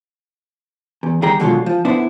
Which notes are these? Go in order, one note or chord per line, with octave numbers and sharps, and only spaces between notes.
E2
D#3 G3 G#4 G5 A#5
B2 D3 D#3 F#3 G#3 F4
F3
D3 B3 D4 E4 B4 C5